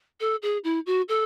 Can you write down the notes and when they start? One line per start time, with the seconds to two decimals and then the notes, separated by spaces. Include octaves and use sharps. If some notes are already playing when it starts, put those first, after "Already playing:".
0.20 A4
0.42 G#4
0.64 E4
0.86 F#4
1.08 A4